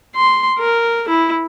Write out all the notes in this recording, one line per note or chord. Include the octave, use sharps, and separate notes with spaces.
C6
A#4
E4